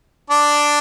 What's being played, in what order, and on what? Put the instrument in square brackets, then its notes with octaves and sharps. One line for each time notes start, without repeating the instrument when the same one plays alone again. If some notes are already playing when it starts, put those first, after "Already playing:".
[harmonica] D4 D5